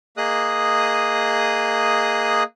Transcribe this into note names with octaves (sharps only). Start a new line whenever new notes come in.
A#3 G#4 D#5 D#6 F#6